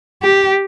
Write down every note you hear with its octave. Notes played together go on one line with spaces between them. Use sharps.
G4